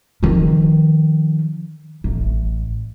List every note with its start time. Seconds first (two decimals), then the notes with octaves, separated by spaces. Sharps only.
0.23 D#3 F3
2.04 A1